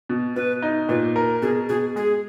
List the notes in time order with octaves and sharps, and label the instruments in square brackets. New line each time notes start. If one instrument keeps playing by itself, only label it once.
[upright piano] B2
[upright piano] B2 [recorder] B4
[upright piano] D#4
[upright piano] A#2 [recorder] B4
[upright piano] A#4
[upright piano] B2 [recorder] G#4
[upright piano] B2 [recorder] G#4
[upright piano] G#3 [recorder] G#4